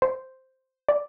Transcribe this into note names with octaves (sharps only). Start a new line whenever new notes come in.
C5
D5